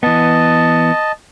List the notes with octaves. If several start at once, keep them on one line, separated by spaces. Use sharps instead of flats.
E3 B3 D#5 A5